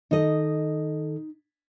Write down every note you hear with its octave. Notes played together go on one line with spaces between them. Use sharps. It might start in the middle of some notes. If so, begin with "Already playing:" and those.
D#3 D#4 A4 D#5